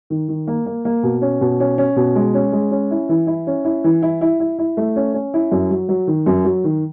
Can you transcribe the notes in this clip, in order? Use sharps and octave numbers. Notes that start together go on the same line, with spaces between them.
D#3
D#3
A#3
A#3
A#3
B2
C#4
B2
C#4
C#4
B2
G#3
C#4
G#3
C#4
E4
E3
E4
C#4
E4
E3
E4
E4
E4
E4
A3
C#4
C#4
E4
F#2
F#3
F#3
D#3
F#2
F#3
D#3